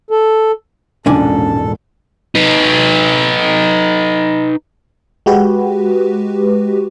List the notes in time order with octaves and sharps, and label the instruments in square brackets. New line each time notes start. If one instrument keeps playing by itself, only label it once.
[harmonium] A4
[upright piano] E1 A#1 [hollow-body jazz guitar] G#2 D4 G#5 [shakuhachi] C#4 [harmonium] A4
[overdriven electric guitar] D#4 B4
[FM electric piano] G#3 F#4 G4 B4